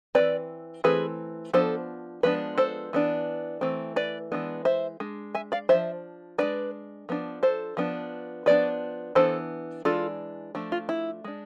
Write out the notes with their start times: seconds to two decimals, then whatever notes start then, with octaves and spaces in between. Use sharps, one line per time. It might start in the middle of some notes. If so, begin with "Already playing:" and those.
0.15 E3 A3 C4 B4 D5
0.84 E3 A3 C4 G#4 B4
1.53 F3 B3 D4 A4 C5
2.23 F3 G#3 B3 D4 B4
2.58 A4 C5
2.93 E3 B3 D4
3.61 E3 A3 C4
3.96 B4 D5
4.32 E3 G#3 B3 D4
4.65 C5 E5
5.00 G#3 D4
5.35 E5 G#5
5.52 D5 F5
5.69 F3 A3 D4 C5 E5
6.38 G#3 B3 D4 B4 D5
7.09 F3 B3 D4
7.43 A4 C5
7.77 F3 B3 D4
8.46 F3 B3 D4 B4 D5
9.15 E3 B3 D4 A4 C5
9.85 E3 G#3 D4 F4 A4
10.55 F3 A3 D4
10.72 F4
10.89 E4
11.24 G#3 D4